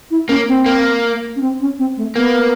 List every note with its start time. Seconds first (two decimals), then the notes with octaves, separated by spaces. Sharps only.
0.11 E4
0.29 A#3 C#4
0.48 C4
0.66 A#3
1.36 C#4
1.41 C4
1.60 C#4
1.79 C4
1.97 A3
2.16 A#3 B3